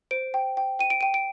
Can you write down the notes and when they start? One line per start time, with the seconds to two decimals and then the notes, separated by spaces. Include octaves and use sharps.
0.11 C5 D7
0.34 G5
0.57 G5
0.79 G5 D#7
0.90 D7
1.01 G5 D#7
1.14 D7